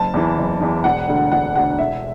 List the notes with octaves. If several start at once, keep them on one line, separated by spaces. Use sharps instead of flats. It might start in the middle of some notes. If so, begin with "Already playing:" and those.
Already playing: F#1 A5
E2 E3
F#1
E2 E3
E1 F#5
D2 D3
E1 F#5
D2 D3 F#5
E1 E5